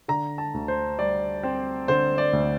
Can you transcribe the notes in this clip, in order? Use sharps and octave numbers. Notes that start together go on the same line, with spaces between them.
D3 A#5
A5
D2
C5
G3 D5
C4
D3 C5
D5
D2